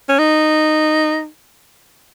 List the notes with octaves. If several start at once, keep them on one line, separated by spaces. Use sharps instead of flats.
C#4
D#4